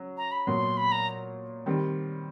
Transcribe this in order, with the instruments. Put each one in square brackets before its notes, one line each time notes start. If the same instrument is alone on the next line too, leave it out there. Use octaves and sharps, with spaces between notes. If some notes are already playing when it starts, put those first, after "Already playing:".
Already playing: [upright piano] C#3 F#3
[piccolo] A#5
B5
[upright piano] A#2 F#3 B3 [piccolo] C6
[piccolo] B5
A#5
[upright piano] D#3 G3 C4